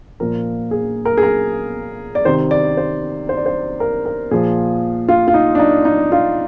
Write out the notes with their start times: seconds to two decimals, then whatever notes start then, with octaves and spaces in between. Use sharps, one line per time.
0.20 A#2 F3 A#4
0.71 G#4
1.05 A#4
1.17 G#4
1.23 A#4
2.15 D5
2.25 C3 D#3 C5
2.51 D5
2.77 C5
3.29 C5
3.37 D5
3.46 C5
3.80 A#4
4.06 A#4
4.31 A#2 F3 G#4
5.08 F4
5.28 F4
5.34 D#4
5.55 D4
5.60 D#4
5.85 D#4
6.12 F4